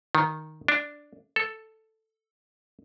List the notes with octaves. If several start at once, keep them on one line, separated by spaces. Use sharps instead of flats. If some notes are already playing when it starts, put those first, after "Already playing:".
D#3
D4
A4